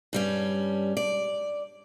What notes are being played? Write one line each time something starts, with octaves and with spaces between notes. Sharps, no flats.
G2 G3 C#4
D5